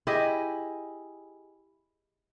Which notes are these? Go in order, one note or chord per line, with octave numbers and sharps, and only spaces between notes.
E4 G4 G#4 D#5